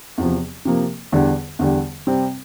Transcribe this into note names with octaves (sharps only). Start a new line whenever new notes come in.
E2 C3 F3
C3 F3 A#3
E2 D3 G3
E2 D3 G3
C3 G3 C4